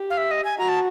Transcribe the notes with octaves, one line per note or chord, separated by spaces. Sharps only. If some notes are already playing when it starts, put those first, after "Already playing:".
Already playing: G4
F5
E5
D#5
G#5
F#4 A#5
A5